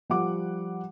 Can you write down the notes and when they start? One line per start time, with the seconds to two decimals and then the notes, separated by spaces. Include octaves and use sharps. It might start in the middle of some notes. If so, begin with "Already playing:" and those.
0.10 F3 G3 F#5 D6